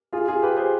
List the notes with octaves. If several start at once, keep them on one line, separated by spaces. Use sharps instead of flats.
F4 G#4
F4 G#4
G4 B4
G#4 C5